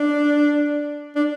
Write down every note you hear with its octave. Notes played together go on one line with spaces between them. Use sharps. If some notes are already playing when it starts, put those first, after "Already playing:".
Already playing: D4
D4